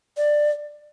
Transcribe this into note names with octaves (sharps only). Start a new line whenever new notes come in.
D5